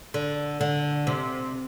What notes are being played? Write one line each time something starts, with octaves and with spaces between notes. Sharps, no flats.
D3
D3
C3